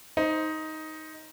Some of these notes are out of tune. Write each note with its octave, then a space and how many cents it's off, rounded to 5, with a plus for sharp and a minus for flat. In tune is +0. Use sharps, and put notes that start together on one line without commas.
D#4 +10 C5 +0